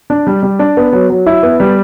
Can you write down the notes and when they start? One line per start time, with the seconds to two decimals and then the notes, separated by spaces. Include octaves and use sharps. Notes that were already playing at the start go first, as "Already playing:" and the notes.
0.10 D4
0.27 G3
0.42 G3
0.59 D4
0.77 B3
0.93 F#3
1.10 F#3
1.26 E4
1.43 B3
1.60 G3